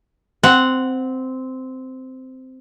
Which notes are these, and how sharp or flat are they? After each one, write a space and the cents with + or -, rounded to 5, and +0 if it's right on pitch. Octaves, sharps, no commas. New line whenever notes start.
C4 -10 F#5 +0